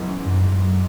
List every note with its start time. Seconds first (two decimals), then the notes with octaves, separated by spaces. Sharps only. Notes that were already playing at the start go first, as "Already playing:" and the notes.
Already playing: G#2 E3 F#3 G#3 B3
0.08 C#4
0.25 F#2
0.44 F#2
0.61 F#3